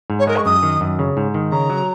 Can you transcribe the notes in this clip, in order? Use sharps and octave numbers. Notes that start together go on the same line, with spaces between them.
G#2
C#5
G#3 A#4
C#6
F#2 D#6
D#3
F#2
C#3
G#2
D#3
C#3 A#5
F#3